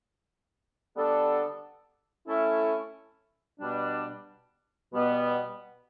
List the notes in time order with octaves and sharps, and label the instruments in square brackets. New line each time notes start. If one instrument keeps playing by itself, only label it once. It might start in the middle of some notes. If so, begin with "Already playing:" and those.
[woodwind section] D3 G3 B3 D4 A4
A3 C#4 E4 A4
B2 G3 D4
B2 G3 B3